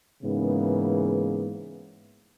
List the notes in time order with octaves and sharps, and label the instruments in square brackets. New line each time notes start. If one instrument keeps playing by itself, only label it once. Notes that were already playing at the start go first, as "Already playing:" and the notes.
[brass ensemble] G#2 C#3 E3 A#3 B3